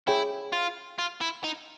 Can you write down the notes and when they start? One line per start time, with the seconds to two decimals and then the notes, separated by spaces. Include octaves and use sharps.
0.08 E4 G#4 C#5 E5 G5
0.53 F4
0.99 F4
1.21 E4
1.44 D#4